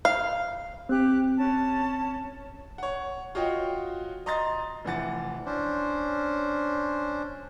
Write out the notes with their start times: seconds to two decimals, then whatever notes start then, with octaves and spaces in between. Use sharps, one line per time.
0.05 F5
0.89 C4 G4 F#6
1.37 C#4 A5
2.78 C#5 F#5
3.35 F4 F#4 C#5 D#5 G5
4.26 D#5 A#5 C6 D#6 A6
4.84 F1 E3 F#5 A6
5.46 C#4 D4 C5